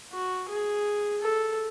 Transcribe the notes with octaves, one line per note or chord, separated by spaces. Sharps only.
F#4
G#4
A4